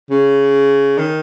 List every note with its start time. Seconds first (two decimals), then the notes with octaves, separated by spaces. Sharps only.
0.10 C#3
0.99 D#3